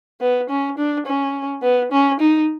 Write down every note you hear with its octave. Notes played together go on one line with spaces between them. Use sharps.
B3
C#4
D4
C#4
B3
C#4
D#4